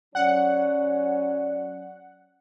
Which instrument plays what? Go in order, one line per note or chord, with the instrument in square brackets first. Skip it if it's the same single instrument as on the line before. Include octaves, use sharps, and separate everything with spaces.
[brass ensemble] F#3 C#4 [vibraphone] D5 [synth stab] F#5